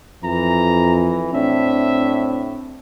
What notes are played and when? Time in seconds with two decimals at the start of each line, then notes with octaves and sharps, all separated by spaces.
0.24 F2 E3 A#5
1.34 A2 C4 D4 E5